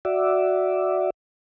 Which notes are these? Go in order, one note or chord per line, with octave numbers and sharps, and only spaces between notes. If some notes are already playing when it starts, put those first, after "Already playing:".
F#4 D5 E5